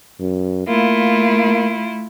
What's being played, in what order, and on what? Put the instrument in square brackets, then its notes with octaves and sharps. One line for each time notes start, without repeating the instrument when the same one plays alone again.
[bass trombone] F#2
[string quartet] A3 E4 F4 [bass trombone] A#3